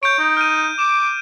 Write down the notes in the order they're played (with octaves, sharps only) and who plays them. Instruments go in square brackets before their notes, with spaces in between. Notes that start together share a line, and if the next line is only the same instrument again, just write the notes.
[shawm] C#5 [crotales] G6 D7
[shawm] D#4 [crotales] D7
[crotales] F6 D#7
[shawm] D6 [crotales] E7